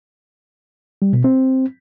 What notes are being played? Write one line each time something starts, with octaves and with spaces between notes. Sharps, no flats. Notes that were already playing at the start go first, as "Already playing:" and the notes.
G3
B2
C4